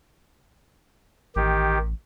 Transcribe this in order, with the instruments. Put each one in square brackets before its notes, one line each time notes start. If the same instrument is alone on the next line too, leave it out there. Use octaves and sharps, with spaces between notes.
[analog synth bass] A1 [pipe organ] D#3 G4